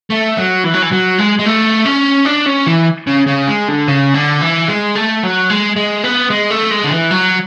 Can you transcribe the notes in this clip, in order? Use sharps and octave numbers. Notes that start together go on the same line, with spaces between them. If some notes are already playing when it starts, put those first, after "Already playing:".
A3
F#3
E3
F#3
E3
F#3
G#3
G#3
A3
C#4
D4
C#4
E3
C#3
C#3
G#3
D3
C#3
D3
E3
G#3
A3
F#3
G#3
G#3
B3
G#3
A3
G#3
D3
E3
F#3